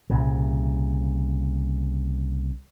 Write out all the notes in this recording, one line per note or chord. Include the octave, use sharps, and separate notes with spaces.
C2 A#2 C#3